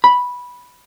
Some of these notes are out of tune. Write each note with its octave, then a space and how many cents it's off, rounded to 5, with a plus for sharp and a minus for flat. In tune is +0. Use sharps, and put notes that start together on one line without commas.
B5 -5